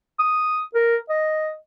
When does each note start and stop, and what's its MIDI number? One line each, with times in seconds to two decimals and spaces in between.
0.19 0.60 87
0.75 0.96 70
1.10 1.52 75